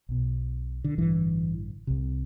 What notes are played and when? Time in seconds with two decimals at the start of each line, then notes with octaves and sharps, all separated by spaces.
0.09 B1 B2
0.84 D3
0.98 A1 G2 D3 E3
1.87 C2 C3